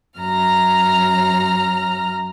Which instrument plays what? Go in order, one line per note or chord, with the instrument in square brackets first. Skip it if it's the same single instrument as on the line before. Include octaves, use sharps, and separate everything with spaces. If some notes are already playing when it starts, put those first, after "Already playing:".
[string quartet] F#2 A#5 F6